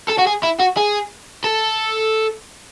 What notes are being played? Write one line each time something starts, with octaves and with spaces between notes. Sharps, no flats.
A4
F#4
G#4
E4
F#4
G#4
A4